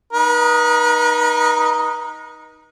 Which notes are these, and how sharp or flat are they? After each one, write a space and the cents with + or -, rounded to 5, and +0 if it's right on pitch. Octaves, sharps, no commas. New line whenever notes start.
D#4 +0 B4 -40